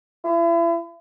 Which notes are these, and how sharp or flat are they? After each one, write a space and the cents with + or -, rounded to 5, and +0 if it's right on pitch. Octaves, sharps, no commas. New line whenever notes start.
E4 +40